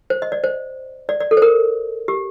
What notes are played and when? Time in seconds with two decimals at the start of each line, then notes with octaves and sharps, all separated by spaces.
0.10 C5
0.22 D#5
0.32 D5
0.44 C5
1.09 D5
1.20 D5
1.31 A4
1.37 C5
1.42 A#4
2.08 G4